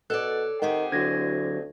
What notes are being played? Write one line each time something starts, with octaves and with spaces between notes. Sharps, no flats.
B2 A4 C#5 D5 F#6
D#3 C4 G4 G#4 F#5
D2 D3 F#3 G#6 A#6